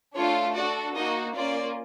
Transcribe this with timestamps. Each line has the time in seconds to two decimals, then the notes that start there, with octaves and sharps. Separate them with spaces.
0.14 A3 D4 F4 A4 C#5
0.54 D4 F#4 A4 D5
0.94 A#3 D#4 F#4 D#5
1.34 A#3 C#4 F4 D5